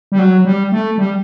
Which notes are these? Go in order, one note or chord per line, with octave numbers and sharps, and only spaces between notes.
G3
F#3
G3
A3
G3